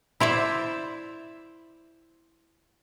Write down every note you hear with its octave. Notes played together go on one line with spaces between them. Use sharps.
E4 C5 D5 E5